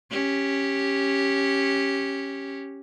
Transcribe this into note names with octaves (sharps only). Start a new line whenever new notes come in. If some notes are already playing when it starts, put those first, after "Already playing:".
C#4 G4